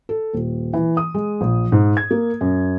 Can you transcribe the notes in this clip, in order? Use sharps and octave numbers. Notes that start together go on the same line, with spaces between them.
A4
D#1
E3
D#6
G#3
A#1
G#2
G#6
A#3
F#2